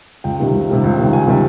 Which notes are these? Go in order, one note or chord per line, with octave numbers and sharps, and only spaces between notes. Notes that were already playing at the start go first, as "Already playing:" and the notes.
C#2 G5
C3 D#3 G3
C#2
C3 D#3 G3
C#2
C3 D#3 G3
C#2 G#5
C3 D#3 G3